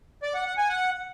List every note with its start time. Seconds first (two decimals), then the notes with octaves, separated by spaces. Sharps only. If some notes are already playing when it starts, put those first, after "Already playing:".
0.23 D5
0.34 F#5
0.46 F#5
0.58 G#5
0.69 F#5